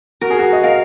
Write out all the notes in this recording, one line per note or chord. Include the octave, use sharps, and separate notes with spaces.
F#4 A#4
G#4
F#4
D#5
A#4 F5